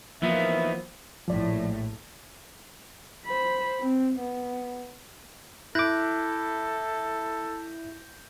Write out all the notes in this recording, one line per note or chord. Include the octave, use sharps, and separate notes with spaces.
E3 F3 A#3 B3 D#4 F4 E5
A#1 A2 F3 D5
C5 B5
C4
B3
E4 A4 D6 F#6 G6 A#6